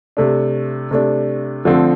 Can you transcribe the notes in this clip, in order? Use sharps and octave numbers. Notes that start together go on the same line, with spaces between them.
C3 A3 D4
C3 A3 D4
D3 F3 A3 C4 A4